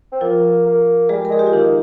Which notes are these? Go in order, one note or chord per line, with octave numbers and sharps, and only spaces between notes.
C4
F3 A#3 F4
A#3
G3 G#3 G#4
A#4
G#3 G#4
G4
F4
D#3 A#3 D#4